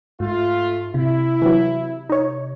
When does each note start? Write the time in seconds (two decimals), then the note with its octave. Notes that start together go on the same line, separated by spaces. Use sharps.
0.20 G#2 A3 F4
0.94 C3 E4
1.42 E3 F#3
2.09 D#4 C#5